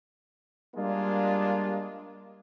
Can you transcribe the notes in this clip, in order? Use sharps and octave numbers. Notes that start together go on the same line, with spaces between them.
G3 G#3 A#3 D4 F4